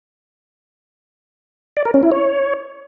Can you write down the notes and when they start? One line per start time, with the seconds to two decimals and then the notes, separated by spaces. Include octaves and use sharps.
1.77 D5
1.85 A#4
1.94 C#4
2.03 E4
2.11 C#5